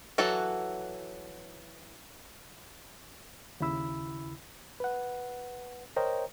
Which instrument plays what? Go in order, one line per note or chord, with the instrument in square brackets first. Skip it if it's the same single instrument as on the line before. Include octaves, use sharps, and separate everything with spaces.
[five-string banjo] E3 F#3 F#4 A4
[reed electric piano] D#2 C#3 E4 B5 E6
B4 F#5
A#4 C5 C#5 D#5 G5 A#5